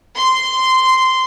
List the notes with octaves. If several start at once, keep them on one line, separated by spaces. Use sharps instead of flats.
C6